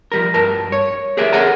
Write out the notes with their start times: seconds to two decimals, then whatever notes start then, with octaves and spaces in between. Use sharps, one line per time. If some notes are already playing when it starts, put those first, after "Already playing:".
0.12 F3 G3 A#4
0.34 G2 A#4 A5
0.72 C#5
1.17 G4 G#4 A#4 D5 E5
1.33 A4 A#4 C#5 F#5 G#5 A#5